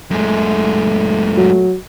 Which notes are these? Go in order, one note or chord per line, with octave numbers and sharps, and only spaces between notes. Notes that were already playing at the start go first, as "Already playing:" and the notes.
F#2 A#2 G#3 A3
F#3